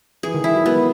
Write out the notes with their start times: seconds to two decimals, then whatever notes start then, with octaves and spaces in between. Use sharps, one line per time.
0.23 E3 G#4
0.34 D#3
0.44 E3 E4
0.55 F#3
0.65 F#3 B3